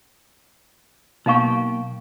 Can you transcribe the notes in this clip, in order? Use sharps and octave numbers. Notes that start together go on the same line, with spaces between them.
B1 B2 A#3 D#4 F5 G5 C#6